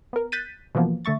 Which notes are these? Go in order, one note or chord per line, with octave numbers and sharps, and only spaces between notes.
B3 A#4
F#6 G6 A6 B6 D#7
B2 E3 F3 A#3 B3
D3 A3 E5 C#6 A6